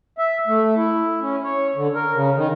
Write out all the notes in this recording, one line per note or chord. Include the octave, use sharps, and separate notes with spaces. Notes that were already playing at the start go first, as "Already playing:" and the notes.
E5
A3
E4
C#4
C#5
D3
A#4
C#3
D#3